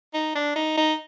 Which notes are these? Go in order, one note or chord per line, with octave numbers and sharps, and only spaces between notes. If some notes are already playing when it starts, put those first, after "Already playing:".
D#4
D4
D#4
D#4